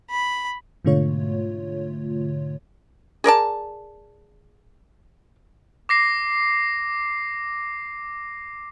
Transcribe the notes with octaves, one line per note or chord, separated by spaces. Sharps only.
B5
G#2 B2 D3 A3 F4 C#5
G#4 A#4 D5 A5
D6 A#6 C7